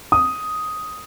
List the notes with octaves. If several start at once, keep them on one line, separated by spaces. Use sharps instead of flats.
D#6